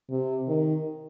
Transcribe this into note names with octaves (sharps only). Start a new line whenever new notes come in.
C3
D#3